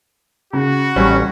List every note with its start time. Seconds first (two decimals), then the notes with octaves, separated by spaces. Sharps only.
0.53 C#3 F#4
0.96 A1 G3 C#4